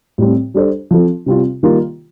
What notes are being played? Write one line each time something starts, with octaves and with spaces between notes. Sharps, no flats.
A2 G3 C4
G3 D4 A4 C5
F3 C4 F4 A4
C3 G3 C4 F4
D#3 G3 A#3 F4